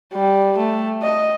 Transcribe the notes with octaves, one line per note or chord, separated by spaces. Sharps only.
G3
A3
D#5